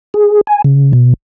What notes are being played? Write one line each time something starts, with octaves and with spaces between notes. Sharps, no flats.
G#4
G#5
C#3
B2